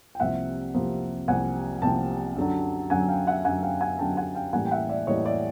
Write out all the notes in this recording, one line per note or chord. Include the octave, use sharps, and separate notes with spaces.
G5
C2 C3 F3 A#3 E5 F#5
C2 C3 F3 A#3
C2 C3 F3 A#3 F#5 G#5
C2 C3 F3 A#3 G5 A5
F#2 D3 F#3
F#2 D3 F#3 F#5 G#5
F5 G5
E5 F#5
F#2 D3 F#3 F#5 G#5
F5 G5
F#5 G#5
F#2 D3 F#3 G5 A5
F#5 G#5
F5 G5
A2 E3 G3 A#3 F#5 G#5
G5
E5 F#5
D5 E5
A2 E3 G3 A#3 C#5 D#5
D5 E5